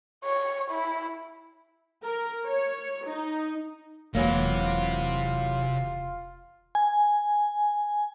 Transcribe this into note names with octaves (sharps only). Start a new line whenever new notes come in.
C#5
E4
A#4
C#5
D#4
E1 C3 E3 F#3 A#3 F4
G#5